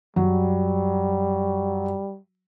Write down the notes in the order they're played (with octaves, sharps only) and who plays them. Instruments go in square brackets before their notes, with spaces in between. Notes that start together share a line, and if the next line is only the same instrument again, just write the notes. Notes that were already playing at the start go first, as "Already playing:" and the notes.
[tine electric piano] F#2 [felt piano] F#3 [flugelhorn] G3